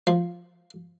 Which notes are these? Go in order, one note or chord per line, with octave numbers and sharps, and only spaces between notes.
F3